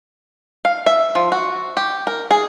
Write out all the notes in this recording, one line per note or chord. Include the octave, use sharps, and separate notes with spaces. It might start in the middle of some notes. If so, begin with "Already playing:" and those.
F5
E5
F3
F#4
G4
A#4
G#4